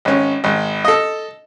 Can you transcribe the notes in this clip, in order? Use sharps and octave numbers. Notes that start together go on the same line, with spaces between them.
G#1 C#4
G#1
A4 D#5